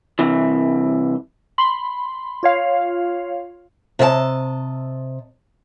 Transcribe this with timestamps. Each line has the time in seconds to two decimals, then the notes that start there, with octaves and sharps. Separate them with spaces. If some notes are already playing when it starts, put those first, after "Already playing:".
0.19 C2 C3 E3
1.58 B5 C6
2.43 F4 C#5 F5
3.99 C3 D#5 E5 A5